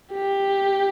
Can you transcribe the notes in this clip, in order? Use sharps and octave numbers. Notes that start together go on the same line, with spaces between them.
G4